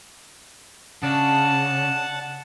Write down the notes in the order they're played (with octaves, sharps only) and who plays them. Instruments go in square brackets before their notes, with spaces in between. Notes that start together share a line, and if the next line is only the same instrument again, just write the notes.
[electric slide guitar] C#3 [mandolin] D4 [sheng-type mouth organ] F#5 A5